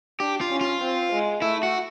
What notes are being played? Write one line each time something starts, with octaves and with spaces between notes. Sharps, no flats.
D4 G4
F4
C#4
F4
C4
G#3
A3 E4
F#4